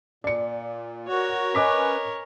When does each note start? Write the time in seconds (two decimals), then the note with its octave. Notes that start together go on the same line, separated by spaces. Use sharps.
0.24 A#2 D5 C#7
1.08 F#4 A#4 C#5
1.55 C#4 B4 D#5 D6 B6